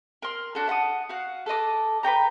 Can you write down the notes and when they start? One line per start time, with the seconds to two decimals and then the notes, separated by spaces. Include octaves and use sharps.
0.22 A#4 C6
0.55 D4 F#4 A4
0.68 E5 F#5 A5 D#6
1.09 F#4 F5 F#5
1.46 A4 B4 D#5 D6
2.03 B4 C#5 G5 A#5